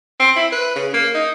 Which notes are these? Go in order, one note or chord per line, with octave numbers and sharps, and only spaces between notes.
C4
E4
B4
C#3
A#3
D#4